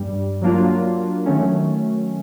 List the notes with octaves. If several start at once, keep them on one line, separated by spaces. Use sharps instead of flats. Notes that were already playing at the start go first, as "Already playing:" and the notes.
Already playing: G2 G3
F#3 A#3 D4 F4
D#3 F#3 A3 C#4